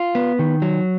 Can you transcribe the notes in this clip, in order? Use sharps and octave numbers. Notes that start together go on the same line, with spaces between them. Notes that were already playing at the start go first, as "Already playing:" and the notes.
Already playing: F4
B3
D#3
F#3